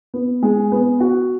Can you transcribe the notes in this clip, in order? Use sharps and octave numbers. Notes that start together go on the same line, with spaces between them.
B3
G#3
B3
F#4